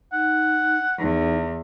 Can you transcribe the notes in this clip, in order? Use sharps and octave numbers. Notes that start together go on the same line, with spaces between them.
D#4 F#5
E2 D#4